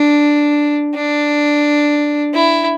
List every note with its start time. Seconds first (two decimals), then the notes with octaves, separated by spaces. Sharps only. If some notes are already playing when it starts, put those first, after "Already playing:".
Already playing: D4
0.95 D4
2.34 E4